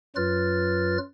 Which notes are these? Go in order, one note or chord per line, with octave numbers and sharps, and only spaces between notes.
F#2 F#3 F4 B4 F6 A6